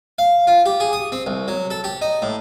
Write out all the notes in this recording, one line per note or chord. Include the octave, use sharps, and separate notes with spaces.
F5
F4
G4
G#4
D#6
C4
C2
F#3
A4
G4
D#4
A2